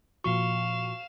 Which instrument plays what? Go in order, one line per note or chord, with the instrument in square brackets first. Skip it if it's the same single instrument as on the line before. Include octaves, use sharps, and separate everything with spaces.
[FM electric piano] A#2 F3 F#4 [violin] F5 E7 [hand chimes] C#6